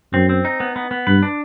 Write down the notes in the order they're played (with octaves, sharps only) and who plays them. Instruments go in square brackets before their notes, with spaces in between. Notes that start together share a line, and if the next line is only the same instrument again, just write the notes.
[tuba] F#2 [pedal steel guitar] C4
[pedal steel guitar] C4
D#4
B3
B3
B3
[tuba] G2 [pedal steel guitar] B4
[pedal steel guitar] D4